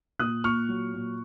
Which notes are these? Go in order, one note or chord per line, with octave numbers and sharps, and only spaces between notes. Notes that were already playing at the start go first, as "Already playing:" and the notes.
A#2 D#6 F#6
A#2 C#6 F6
F#3
A#2